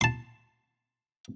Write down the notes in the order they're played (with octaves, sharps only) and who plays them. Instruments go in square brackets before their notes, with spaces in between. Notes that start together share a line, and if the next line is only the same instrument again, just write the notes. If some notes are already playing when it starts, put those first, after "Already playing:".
[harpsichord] A5 C6